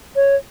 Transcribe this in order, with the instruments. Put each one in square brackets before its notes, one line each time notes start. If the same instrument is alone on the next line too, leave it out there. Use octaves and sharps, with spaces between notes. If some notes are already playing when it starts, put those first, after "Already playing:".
[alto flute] C#5